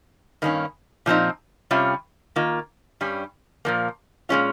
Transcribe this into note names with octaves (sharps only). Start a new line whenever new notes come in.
G2 D#3 A#3 C#4
A#2 F3 C4 D#4
C3 G3 C#4 F4
D#3 A#3 F4
G2 G3 C#4
A#2 F3 A#3
A#2 G#3 C#4 F4